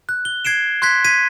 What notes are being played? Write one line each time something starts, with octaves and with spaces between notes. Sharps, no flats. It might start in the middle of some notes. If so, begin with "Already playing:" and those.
F#6
G7
G#6 C7 D7 E7
C6 F#6 G#6 B6
G#6 B6 D#7